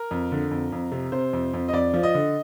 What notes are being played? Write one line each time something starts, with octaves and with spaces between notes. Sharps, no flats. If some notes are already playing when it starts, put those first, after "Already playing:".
Already playing: A#4
F2
D3
F2
F2
C3
C3 C5
F2
F2
D#5
F2 D5
F3
D#5
D3